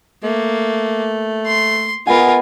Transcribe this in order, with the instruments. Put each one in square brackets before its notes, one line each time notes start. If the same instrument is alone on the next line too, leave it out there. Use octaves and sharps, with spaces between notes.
[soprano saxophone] A3 [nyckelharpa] A#3
[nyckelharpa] C6
[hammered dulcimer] B3 D#5 F#5 [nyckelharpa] F4 A#4 [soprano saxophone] G#5